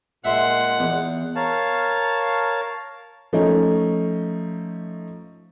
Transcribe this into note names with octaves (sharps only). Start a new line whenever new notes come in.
A#2 G#3 E5 F#5 C6
E2
A#4 C#5 F5 A5
F3 A3 C#4 D#4